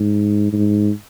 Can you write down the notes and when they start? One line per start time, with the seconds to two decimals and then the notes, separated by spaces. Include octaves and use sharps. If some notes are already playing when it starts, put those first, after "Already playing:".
Already playing: G#2
0.53 G#2